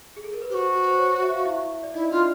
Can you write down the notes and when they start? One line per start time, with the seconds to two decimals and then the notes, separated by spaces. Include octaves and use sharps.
0.17 G#4
0.24 A4
0.33 A#4
0.42 B4
0.50 G4 C5
0.55 F#4
0.87 C5
0.98 C#5
1.22 E5
1.34 F5
1.45 E4 E5
1.83 D5
1.94 D#4 E4 D#5
2.06 D#5
2.11 D4 F4 D5